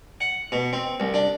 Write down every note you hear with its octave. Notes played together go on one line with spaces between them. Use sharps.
F#5
B2
C4
C2
D4